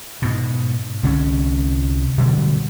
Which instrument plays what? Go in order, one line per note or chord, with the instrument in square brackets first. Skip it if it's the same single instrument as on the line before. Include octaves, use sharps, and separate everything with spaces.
[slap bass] G#2 B2
C2 D3 C4 C#4
B2 D3 F#3 G3